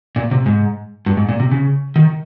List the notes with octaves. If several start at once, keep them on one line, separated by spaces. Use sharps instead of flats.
A#2
C3
G#2
G2
G#2
A#2
C3
C#3
D#3